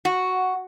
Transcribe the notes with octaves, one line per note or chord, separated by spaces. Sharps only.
F#4